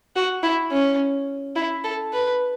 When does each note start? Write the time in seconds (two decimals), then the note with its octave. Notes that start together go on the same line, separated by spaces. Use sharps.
0.16 F#4
0.43 E4
0.71 C#4
1.56 E4
1.84 A4
2.13 B4